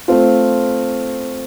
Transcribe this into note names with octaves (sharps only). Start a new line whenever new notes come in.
A3 C4 F4